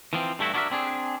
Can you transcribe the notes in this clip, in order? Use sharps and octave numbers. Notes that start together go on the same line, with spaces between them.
E3 F3 C4
G2 A3 E4 F#4
D4 E4 F#4 G#4 A#4 E5
C4 D4 G#4